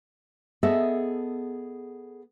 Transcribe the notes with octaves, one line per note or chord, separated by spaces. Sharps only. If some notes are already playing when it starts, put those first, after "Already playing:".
B3 G#4 A4 D#5 E5